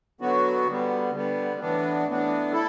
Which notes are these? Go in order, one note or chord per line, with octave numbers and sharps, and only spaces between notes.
D3 F#3 B3 F#4
D3 G3 B3
D3 G3 B3
A2 E3 B3 D4
A2 E3 B3 D4
E4 A4